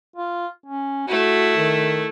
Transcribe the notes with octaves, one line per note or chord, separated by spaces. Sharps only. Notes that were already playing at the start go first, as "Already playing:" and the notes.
F4
C#4
A3 E4 F#4
D#3